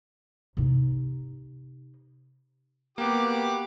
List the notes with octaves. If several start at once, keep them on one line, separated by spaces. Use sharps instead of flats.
C3 D#4
A#3 B3 F#4 G4 B4 D6